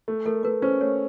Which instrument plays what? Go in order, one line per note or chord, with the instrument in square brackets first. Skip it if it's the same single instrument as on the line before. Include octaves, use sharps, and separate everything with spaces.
[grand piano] A3
[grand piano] A3 [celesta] A#4
[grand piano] A3 [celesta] B4
[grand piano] C#4 [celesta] C5
[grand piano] A3 [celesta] C#5